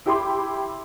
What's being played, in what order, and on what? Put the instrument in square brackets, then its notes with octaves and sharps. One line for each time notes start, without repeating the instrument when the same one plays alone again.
[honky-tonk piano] E4 G4 G5 B5 C6 D6